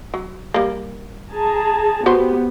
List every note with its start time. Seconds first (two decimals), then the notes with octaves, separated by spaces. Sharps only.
0.14 F#3
0.54 G3 A#3
1.32 G#4 A5 A#5
2.06 B3 F#4 G4 B4 C5